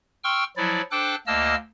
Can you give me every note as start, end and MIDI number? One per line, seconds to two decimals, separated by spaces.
0.24 0.44 79
0.24 0.44 84
0.24 0.44 85
0.24 0.44 88
0.24 0.44 89
0.57 0.81 53
0.57 0.81 54
0.57 0.81 64
0.57 0.81 74
0.91 1.15 62
0.91 1.15 69
0.91 1.15 72
0.91 1.15 79
0.91 1.15 86
0.91 1.15 90
1.27 1.55 38
1.27 1.55 58
1.27 1.55 75
1.27 1.55 81
1.27 1.55 88
1.27 1.55 89